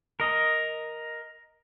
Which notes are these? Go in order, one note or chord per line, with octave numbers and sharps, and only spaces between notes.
A#4 D#5